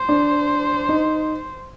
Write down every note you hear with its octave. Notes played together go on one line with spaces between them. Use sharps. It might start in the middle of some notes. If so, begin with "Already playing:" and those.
Already playing: C5
D4
D#4